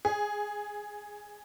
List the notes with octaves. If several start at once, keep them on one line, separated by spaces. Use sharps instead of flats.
G#4